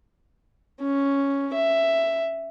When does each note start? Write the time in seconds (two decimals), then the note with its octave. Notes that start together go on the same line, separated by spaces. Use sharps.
0.81 C#4
1.54 E5